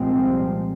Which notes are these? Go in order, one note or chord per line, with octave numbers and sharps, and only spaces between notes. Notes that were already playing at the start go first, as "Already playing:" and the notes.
Already playing: C2 A#2 F3 G#3 C4